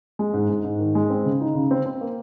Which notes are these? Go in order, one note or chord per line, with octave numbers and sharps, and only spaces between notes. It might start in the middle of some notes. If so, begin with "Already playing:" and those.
G#3
G#2
G#2
G#2
D#3
G#3
C4
C#3
D#4
C#3
C4
C4
A#3